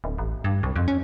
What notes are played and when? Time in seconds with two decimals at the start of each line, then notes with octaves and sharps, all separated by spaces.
0.04 D1
0.18 A1
0.44 G2
0.63 C2
0.76 F2
0.88 C#4